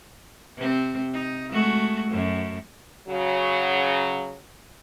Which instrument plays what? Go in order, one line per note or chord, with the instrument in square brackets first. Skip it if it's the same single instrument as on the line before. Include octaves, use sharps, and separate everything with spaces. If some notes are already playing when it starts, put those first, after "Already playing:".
[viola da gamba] C3 C4
D#4
G#3 A3 F#4
F#2 A3
[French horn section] C#3 F#3